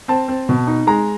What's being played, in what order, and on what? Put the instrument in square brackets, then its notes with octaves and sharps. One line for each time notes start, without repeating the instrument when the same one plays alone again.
[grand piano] C4 A5
C4
B2
D#4
G#3 A#5